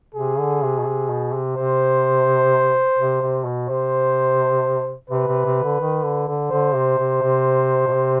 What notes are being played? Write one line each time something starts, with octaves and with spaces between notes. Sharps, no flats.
C3 G#4
D3
C3
B2
C3
B2
C3
C3 C5
C3
C3
B2
C3 C5
C3 B4
C3
C3
D3
D#3
D3
D3
D3 C5
C3
C3
C3
B2
C3